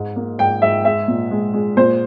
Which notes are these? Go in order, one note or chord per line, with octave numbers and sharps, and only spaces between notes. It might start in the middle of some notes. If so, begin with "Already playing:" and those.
Already playing: G#2
A#3
G#2 G5
G#2 E5
G#3 E5
A#2
G#3
G#3
A#2 C5